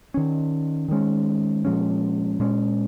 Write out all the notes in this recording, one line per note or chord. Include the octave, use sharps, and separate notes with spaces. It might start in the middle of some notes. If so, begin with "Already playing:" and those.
D#3 C#4
D#3 G#3 C#4
A#2 F3 G#3 C#4
A#2 G#3 C#4